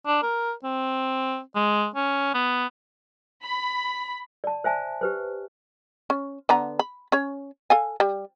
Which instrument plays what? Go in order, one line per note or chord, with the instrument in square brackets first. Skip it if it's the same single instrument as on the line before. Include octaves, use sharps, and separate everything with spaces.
[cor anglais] D4
A#4
C4
G#3
C#4
B3
[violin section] B5
[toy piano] D5 A5
C5 E5 G#5 A5
G4 B4 C5
[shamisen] C#4
D3 B3 A#5
B5
C#4 C#5
A4 F5 G#5
G3